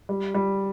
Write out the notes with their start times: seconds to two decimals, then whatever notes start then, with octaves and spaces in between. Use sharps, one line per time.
0.09 G3
0.35 G3